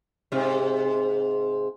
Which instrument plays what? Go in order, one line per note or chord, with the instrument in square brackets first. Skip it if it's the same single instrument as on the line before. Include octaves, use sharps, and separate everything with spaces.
[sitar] G#2 C3